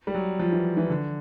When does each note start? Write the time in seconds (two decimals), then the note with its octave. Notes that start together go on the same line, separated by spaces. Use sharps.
0.07 G3
0.14 F#3
0.39 F3
0.52 E3
0.77 E3
0.89 D3